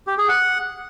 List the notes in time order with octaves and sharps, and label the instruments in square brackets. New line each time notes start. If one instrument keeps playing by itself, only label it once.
[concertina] G4
G#4
F#5